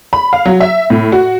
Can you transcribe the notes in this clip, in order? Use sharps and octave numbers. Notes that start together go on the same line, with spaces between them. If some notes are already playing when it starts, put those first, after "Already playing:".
B5
F5
F#3
E5
A2
F#4